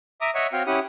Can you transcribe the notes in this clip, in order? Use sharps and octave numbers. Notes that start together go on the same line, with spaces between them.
E5 A#5 D6 D#6
C#5 D#5 E5 F#5 C#6
C4 F#4 C#5 F5 G5
C#4 E4 G4 F#5 D#6